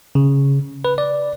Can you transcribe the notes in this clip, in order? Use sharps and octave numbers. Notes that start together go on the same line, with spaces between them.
C#3
B4
D5